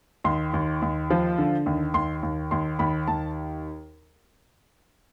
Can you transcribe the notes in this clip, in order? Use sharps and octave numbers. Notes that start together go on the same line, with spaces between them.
D#2 C6
D#2
D#2
F3
D3
D#2
D#2 C6
D#2
D#2 C6
D#2 B5
D#2 A5